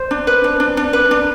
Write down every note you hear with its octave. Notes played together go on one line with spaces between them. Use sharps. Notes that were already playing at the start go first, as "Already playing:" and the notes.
Already playing: C5
D4
B4
D4
D4
D4
B4
D4